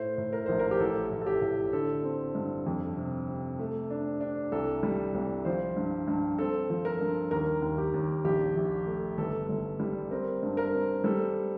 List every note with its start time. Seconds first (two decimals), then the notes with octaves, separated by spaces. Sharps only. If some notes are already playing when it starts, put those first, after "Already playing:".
Already playing: A2 C5
0.18 A2
0.33 A#4
0.46 A#1 C5
0.59 A#4
0.71 G4
0.80 A1 A4
1.11 A2
1.22 A4
1.26 G4
1.42 A2
1.73 D3 A4
2.04 C4
2.35 G2
2.66 F2
2.97 C3
3.28 C3
3.59 A3
3.90 D4
4.21 D4
4.52 C2 A4
4.83 G3
5.15 C2
5.45 F3 C5
5.76 G2
6.07 G2
6.38 C4 A4
6.70 F3
6.85 A#4
7.01 G2
7.31 D#2 A#4
7.62 D#2
7.78 G4
7.94 D#2
8.25 A#1 G4
8.56 A#1
8.87 A3
9.18 G1 A4
9.49 G1
9.80 G3
10.11 C4 A#4
10.43 G2
10.57 A#4
10.73 C4
11.04 G3 A4